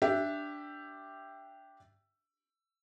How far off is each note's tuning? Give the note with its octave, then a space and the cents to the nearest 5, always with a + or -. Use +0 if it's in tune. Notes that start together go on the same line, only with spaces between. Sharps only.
D4 +0 G4 +0 E5 +15